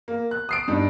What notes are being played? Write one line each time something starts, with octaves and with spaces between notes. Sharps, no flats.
A#3
F#6
D#6 C7 D7
G2 D4 D#4